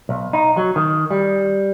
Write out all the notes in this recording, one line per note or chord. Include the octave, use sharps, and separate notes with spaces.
B1
D#4
F#3
D#3
G3